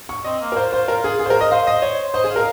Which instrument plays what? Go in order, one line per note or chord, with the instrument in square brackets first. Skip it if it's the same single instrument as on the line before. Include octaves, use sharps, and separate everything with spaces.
[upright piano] C#6
[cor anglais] C4 [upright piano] D#5
[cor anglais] A#3
[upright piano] A#4
[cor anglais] F4 [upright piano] C5
[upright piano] C5
A#4
G#4
G#4
C5
A#4
D#5
[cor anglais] C5 [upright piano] F5
[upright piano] D#5
C#5
[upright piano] C5 [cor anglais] D#5
[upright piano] G#4
[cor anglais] F5
[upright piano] A#4